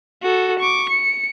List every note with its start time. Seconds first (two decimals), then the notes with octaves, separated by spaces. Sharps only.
0.22 F#4 A4
0.59 C#6 D6
0.89 C#7